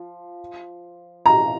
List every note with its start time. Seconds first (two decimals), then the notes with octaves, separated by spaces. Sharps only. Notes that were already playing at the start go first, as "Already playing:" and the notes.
Already playing: F3
1.26 A#5